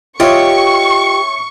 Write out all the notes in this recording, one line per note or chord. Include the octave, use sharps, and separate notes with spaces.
F4 G4 C#5 D#5 E5 C6 C#6